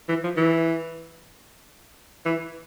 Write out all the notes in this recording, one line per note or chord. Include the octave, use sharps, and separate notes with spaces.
E3
F3
E3
E3